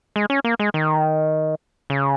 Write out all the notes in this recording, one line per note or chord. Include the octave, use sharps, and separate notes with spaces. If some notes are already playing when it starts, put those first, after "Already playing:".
G#3
C#4
A#3
G#3
D#3
C#3